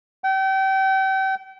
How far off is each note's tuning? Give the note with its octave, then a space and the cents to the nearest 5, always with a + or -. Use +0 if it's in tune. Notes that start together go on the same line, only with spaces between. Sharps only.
G5 -35